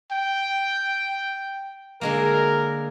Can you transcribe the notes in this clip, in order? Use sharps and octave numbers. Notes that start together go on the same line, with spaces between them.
G5
D3 G#3 A#3 A#4